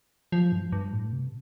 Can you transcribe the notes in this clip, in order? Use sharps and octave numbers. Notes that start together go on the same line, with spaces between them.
F3
G2
G2
A2
C3